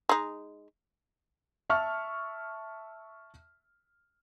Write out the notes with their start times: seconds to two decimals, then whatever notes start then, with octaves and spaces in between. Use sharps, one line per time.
0.09 G#3 D#4
1.70 E5 A5 C#6 F6